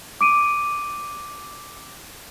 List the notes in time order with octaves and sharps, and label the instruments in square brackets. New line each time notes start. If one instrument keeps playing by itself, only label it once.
[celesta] D6 D7 D#7